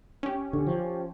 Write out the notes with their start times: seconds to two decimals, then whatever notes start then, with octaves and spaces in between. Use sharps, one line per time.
0.23 C#4 G4
0.53 D3
0.67 F3